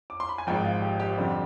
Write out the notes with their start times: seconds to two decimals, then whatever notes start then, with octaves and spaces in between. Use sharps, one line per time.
0.10 D6
0.20 C6
0.29 B5
0.38 G#5
0.47 G#1 G#2 F3 G5
0.65 F5
0.82 G4
1.00 G4
1.17 F2 D3 G3 C4